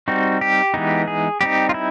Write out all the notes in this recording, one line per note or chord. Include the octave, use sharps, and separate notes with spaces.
G3 C4 D#4 F#4
G4
E3 G#3 B3 D#4
G#4
G3 C4 D#4 G4
F4
E4